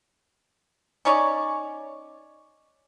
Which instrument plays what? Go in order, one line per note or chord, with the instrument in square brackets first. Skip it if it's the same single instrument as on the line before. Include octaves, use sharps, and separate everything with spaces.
[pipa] C#4 D#4 C#5 D5